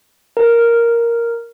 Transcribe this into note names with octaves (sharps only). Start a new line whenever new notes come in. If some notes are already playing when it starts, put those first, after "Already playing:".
A#4